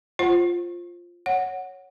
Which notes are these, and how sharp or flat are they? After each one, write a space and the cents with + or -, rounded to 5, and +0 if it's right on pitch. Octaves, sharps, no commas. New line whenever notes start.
F4 +0 C5 +15 F#5 +5
C#5 +0 F#5 +0